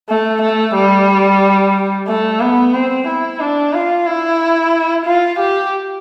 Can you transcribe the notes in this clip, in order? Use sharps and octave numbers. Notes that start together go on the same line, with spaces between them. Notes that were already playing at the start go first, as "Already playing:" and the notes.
A3
A3
G3
A3
B3
C4
E4
D4
F4
E4
F4
G4